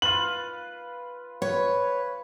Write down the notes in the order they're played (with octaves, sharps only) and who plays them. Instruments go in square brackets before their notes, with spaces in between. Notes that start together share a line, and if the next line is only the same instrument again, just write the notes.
[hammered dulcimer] F4 B4 [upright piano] F#7
[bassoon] B4 [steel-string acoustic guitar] C#5